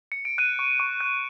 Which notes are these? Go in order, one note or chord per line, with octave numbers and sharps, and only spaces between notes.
C#7
D7
F#6 D#7
C#6
C#6
F#6